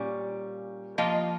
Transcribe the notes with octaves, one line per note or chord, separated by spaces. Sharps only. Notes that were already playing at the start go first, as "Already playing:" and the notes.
Already playing: A#2 G3 C#4
F3 A#3 F4 D#5